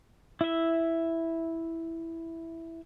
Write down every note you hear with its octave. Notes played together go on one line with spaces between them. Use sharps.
E4 E5